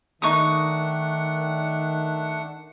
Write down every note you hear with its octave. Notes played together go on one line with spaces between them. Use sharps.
D#3 A3 D4 D#4 F#5 C#6 D#6